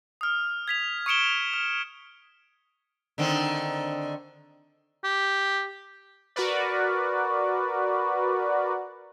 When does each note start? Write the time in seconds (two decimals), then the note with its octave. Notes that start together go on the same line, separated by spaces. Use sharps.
0.21 D#6 F6
0.68 G#6 B6 F7
1.06 C#6 D#6 C#7 D7 E7 G7
1.53 F6
3.18 D3 D#3 C4
5.04 G4
6.36 F#4 A#4 B4 D5